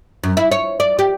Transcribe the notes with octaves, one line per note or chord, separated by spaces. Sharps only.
F#2
E4
C#5
D5
G4